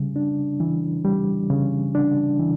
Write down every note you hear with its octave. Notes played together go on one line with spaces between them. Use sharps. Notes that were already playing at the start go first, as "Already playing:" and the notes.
Already playing: C#3 G3
D4
E3
G3
C#3
D4
E3